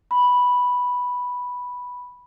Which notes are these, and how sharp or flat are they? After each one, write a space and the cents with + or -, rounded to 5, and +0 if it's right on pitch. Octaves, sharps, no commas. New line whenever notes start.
B5 -5